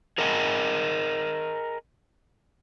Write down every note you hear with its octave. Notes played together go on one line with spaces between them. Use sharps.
G#4 A#4 D#5 F#5 G#5